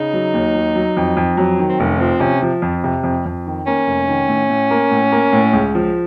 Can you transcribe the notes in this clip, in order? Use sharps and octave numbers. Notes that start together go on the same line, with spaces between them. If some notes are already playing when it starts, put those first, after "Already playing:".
Already playing: C#3 D#4
F#3
D#2
F#3
F#3
F2
F2
F#3
D#3
C4
F1 C#4
F3 C4
C3 C#4
F3
F2
C3
F2
F2
D#3
A#3 C#4
F1
D#3
A2
A2
A#3
A2
A#3
A2
C#2
F3